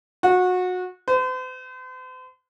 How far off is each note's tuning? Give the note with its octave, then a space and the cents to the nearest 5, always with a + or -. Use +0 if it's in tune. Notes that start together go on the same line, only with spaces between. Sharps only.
F#4 -25
C5 -45